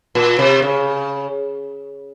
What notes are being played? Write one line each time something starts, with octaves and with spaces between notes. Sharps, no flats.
A#2
C3
C#3